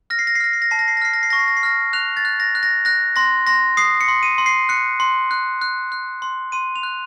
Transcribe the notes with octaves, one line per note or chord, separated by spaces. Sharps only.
F6 A#6
C7
A#6
C7
F6 A#6
C7
A#6
A5 C7
A#6
C7
A#6
F6 C7
A#6
C7
C#6 A#6
C7
A#6
C7
F6 A#6
F#6 F7
A6
F#6
A#6
F#6
A#6
F#6 A#6
C6 A#6
C6 A#6
D#6 C7
C#7
C6
D#7
C6
C7
F#6 C#7
C6
F#6
F#6
F#6
C6
C6 D#7
F7
F#6